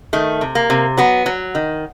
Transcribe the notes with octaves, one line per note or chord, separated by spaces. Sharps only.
D#3 A3
C3
A#3
C3
F#3 B3
F#3
D#3